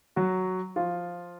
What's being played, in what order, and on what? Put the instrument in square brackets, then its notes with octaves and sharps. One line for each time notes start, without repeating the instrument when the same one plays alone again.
[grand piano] F#3 F#4
F3 F4